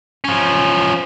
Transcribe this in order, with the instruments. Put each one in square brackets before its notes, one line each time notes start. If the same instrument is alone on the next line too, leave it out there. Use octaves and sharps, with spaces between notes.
[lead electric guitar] F3 C#4